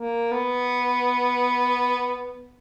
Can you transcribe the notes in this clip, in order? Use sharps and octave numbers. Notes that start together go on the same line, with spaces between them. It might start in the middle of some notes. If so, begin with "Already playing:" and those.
Already playing: A#3
B3